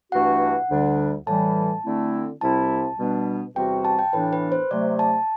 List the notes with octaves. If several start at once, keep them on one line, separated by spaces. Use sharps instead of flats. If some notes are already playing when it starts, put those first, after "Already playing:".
G2 E3 A3 D4 F#4 F#5
D2 D3 G3 D4
A2 E3 G3 A5
D3 A3 C4 E4
C2 C3 G3 C4 E4 A5
B2 G3 B3 D4
E2 C3 G3 C4 F#4 G5
A5
G5
A2 E3 B3 D4 B4
B4
C5
C3 F#3 A3 D5
A5